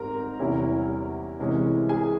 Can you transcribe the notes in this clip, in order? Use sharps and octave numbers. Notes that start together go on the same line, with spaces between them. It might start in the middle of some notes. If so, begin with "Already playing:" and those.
Already playing: G#2 G3 C4 A#4 A#5
E2 C3 G3 C#4 E4
C2 C3 E3 G#3 C#4
G#4 G#5